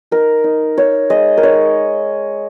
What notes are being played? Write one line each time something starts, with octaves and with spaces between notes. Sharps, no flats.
D#4 A#4
D#4
D#4 C#5
G#3 D#5
A#4
D#4 C#5